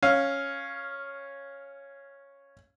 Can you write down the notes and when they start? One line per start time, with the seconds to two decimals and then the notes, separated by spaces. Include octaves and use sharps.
0.02 C#4 F5